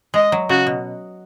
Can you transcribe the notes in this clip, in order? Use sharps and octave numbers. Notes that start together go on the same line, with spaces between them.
G#3 D#5
F#3
C#3 F#4
B2